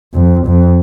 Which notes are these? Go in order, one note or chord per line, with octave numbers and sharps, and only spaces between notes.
F2
F2